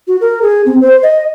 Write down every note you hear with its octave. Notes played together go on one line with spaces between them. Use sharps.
F#4
A#4
G#4
C4
C5
D#5